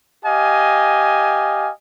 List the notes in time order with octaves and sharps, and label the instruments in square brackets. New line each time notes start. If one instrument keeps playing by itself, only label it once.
[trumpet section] G4 D#5 F5 G#5